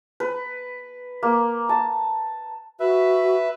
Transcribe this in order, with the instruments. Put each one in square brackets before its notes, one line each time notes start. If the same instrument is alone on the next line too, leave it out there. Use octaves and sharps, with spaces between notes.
[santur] B4
A#3
A5
[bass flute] F#4 [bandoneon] B4 E5